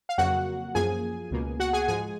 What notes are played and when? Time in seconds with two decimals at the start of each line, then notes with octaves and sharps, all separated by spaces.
0.09 F5
0.18 F2 C#3 F#3 A#3 F#4 F#5
0.75 F#2 F3 A#3 G#4 G#5
1.31 C#2 B2 A#3
1.60 F#4 F#5
1.73 G#4 G#5
1.88 G#2 F3 G#3 G#4 G#5